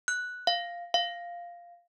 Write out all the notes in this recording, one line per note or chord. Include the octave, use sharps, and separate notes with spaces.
F#6
F5
F5